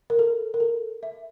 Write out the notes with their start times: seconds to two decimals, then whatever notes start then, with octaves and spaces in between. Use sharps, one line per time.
0.10 A#4
0.19 A4
0.54 A#4
0.60 A4
1.03 E5